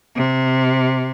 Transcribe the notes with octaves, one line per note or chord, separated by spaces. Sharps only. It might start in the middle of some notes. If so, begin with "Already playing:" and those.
C3